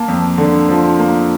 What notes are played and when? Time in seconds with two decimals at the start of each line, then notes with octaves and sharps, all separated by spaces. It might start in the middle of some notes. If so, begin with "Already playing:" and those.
Already playing: A#3 A5
0.08 F2
0.38 D3
0.69 F3
0.99 A#3